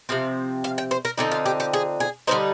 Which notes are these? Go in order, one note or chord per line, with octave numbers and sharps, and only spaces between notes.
C3 F3 C4 F5
F5
G5
C5
A#4
D3 F3 C4 D#4 G4
F4
G4
G4
G#4
G#4
D3 G3 C4 D#4 C5